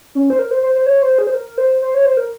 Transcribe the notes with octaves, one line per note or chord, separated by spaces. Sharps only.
C#4
C5
A#4
C5
C5
C5
C#5
C5
G#4
C5
A#4
C5
C5
C#5
C5
A#4